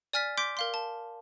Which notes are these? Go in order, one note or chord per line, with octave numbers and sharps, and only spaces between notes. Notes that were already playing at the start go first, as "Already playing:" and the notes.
D5 G#5 F6 A6 B6
C6 D6 G6 B6 D7
A#4 F5 C6
A5